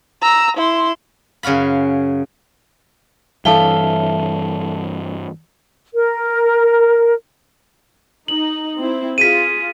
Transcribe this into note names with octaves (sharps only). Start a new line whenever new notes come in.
A#5 E6
E4 C6
F#2 C#3 F#4 F5 B5
G2 E3 A4 C#5 E5 F5 A5 G7
A#4
D#4 F#7
C4 E4
F4 G#4 B6 D#7